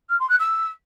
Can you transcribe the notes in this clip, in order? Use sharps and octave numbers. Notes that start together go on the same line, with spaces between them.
F6
C6
F#6
E6